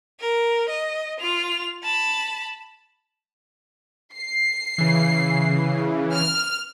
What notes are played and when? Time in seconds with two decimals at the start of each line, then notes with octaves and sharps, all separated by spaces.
0.20 A#4
0.69 D#5
1.20 F4 F7
1.84 A5 B5
4.14 C7
4.78 C#3 E3
6.14 F6